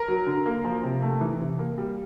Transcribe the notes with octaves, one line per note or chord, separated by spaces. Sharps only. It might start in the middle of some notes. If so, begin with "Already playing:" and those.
Already playing: A#4
F#3
D3
A#3
F3
C3
A3
E3
C3
A#3
G3